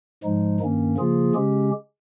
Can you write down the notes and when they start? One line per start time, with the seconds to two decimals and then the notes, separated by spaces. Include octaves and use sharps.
0.23 G#2 F3 G#3 D#4
0.60 G2 D#3 A#3 C#4
0.97 C#3 F3 A#3 F4 G#4
1.35 C#3 G#3 C#4 G4